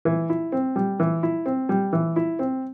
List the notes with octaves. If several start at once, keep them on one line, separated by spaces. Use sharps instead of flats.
E3
E4
C4
G3
E3
E4
C4
G3
E3
E4
C4